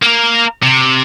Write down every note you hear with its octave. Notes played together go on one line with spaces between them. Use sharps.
A#3 A#4
C3